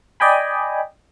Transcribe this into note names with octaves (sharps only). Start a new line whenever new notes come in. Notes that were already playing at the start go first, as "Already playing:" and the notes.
D5 D#5 G5 G#5 B5